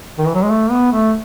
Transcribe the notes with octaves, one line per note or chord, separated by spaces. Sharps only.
D#3
E3
F#3
G#3
A3
B3
A3